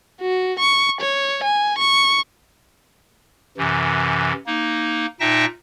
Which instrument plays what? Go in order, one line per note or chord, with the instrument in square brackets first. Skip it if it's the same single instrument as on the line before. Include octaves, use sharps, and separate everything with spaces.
[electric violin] F#4
C#6
C#5
G#5
C#6
[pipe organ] F#2 C3 E3
A#3 D#4
A#2 D#4 E5 G5 A5 A#6